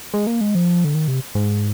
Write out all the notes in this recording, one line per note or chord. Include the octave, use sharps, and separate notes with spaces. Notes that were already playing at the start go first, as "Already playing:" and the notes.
G#3
A#3
G#3
F3
D3
D#3
C3
G#2